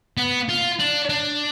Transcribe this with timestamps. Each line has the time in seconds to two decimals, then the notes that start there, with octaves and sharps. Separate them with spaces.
0.17 B3
0.49 F4
0.79 D4
1.09 D4